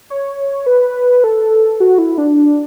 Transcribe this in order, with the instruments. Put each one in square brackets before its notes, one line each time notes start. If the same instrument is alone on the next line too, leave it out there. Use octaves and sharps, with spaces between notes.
[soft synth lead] C#5
B4
A4
F#4
E4
D4